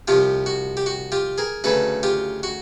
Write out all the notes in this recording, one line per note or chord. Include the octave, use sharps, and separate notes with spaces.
C2 C3 F3 F4 G4
F#4
G4
F#4
F4 G4
G#4 A#4
D2 C#3 F#3 A4 B4
F4 G4
F#4